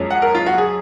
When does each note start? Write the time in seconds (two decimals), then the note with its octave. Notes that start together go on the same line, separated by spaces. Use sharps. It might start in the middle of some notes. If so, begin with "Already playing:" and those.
Already playing: F#2 F3 G#3 C#4
0.10 F#5
0.22 A#4
0.35 F4
0.46 F#4
0.58 G#4